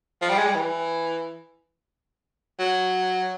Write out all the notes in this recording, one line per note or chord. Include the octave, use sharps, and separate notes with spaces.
F3
G3
G#3
G3
E3
F#3